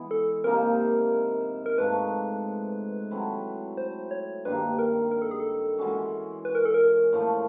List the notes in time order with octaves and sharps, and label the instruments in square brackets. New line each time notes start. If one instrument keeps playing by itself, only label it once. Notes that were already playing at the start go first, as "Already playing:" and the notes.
Already playing: [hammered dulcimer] E3 G#3 B3
[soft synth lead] A4
[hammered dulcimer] C3 F3 A#3 D#4 [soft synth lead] A#4
[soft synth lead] A#4
[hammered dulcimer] G#2 F3 A3 [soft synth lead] B4
[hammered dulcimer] F#3 A3 C4 E4
[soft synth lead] C5
C#5
[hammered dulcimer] G2 D#3 G3 A#3 [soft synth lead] B4
[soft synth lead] A#4
A#4
A4
G#4
A4
[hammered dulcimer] E3 G#3 C#4 F#4
[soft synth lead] B4
A#4
A4
A#4
[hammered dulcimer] A2 F3 A3